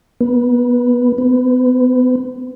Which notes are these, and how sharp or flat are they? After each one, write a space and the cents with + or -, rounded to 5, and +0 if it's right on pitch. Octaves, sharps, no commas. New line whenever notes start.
B3 -15
B3 +35